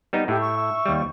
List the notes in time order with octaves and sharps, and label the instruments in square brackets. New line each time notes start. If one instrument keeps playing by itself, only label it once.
[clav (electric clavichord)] G3 B3 D#4
[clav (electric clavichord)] A2 [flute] G4 [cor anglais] E5
[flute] C#6
[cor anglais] E5
[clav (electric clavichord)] D#2 G3